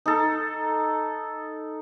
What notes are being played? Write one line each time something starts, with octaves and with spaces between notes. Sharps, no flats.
D#4 A4